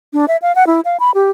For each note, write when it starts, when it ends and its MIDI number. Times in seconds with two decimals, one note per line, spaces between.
0.13 0.26 62
0.28 0.37 76
0.42 0.55 77
0.55 0.67 78
0.67 0.81 64
0.85 0.97 77
1.00 1.11 83
1.15 1.31 67